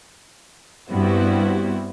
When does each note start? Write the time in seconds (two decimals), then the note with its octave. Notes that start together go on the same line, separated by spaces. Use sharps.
0.90 G2 G3 B3 C4 E4 F#4